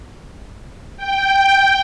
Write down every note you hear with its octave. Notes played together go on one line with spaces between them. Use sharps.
G5